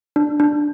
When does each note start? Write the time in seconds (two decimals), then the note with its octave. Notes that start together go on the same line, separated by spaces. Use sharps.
0.16 D4
0.40 D4